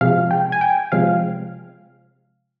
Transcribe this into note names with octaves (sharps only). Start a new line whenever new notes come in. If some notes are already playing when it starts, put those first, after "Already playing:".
C3 F3 G#3 F5
G5
G#5
G5
C3 F3 G#3 F5